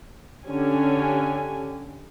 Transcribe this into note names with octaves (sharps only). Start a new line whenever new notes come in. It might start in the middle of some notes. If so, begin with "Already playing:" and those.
D3 C#4 G4 G#5